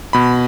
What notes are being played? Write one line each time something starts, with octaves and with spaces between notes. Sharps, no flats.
B2 B5